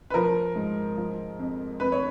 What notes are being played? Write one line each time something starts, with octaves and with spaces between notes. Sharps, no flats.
B4
F3 A#4
G#2
F3
F2
F2 B4
C#5